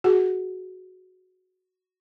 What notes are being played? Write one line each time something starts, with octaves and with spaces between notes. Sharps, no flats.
F#4 G#4 F#5